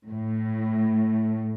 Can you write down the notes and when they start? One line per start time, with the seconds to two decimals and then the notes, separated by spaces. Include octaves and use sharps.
0.10 A2